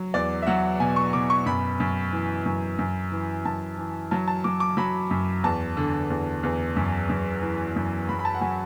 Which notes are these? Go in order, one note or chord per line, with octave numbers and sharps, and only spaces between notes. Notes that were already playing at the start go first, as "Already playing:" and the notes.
Already playing: F#3
E2 D5
E5
F#3 F#5
B2 G#5
C#6
B2 D6
C#6
F#2 B5
F#2
E3
F#2
F#2
E3
F#2 A5
E3
F#3 A5
A5
F#3 D6
D6
F#3 B5
F#2
E2 A5
D3
E2
E2
F#2
F#2
E3
F#2
F#3 B5
B5
A5
F#5
F#3 G#5